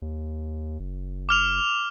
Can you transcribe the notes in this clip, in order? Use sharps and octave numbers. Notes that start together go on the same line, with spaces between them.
D#2
F#1
D6 F6 F7